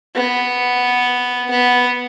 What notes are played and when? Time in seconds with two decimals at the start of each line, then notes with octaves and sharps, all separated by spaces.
0.15 B3
1.51 B3